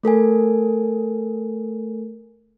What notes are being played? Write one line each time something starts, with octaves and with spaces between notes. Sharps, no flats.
A3 A4 A#4 G#5